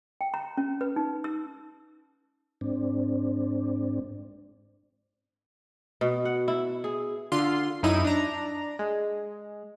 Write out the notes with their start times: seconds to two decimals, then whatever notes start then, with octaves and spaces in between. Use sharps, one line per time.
0.21 G5
0.34 A#5
0.57 C#4
0.81 B4
0.96 D#4
1.24 E6
2.61 G#2 C4 D4
6.01 B2
6.25 F#5
6.48 E4
6.84 G#4
7.32 D3 F4 C6
7.83 F#2 C#4 D#4 E4 D#7
8.05 D4 A#5
8.79 G#3